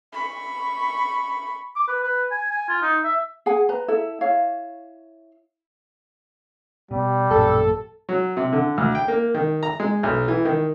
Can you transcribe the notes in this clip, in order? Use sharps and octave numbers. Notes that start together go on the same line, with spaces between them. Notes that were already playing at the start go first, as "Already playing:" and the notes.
B5 C#6
D6
B4
B4
G#5
G#5
F4
D#4
E5
G#4 F#5 G#5
B4 A#5
E4 A4 E5
E4 C#5 F5
B2 G3
A1 F#2 A#2 A4
F#3
C3
D3
D2
G5
A#3
D#3
A#5
G#3
B1
E3
D#3